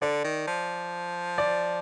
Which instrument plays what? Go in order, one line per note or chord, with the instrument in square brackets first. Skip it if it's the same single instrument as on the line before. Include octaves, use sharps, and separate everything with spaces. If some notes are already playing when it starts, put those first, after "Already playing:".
[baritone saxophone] D3 [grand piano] D5
[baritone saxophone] D#3
F3
[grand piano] D5